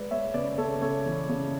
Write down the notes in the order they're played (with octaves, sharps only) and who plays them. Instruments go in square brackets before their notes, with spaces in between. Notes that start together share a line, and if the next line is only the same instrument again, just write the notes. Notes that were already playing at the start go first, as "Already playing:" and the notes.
Already playing: [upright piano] G#3 B4 D5
G#3 C#5 E5
C#3 B4 D5
C#3 A4 C#5
C#3 A4 C#5
E3
C#3